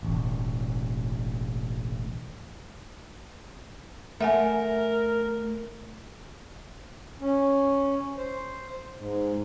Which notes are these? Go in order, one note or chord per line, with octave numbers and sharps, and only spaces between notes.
E1 A1
A3 A#4 E5 F#5 G#5
C#4
C5
G#2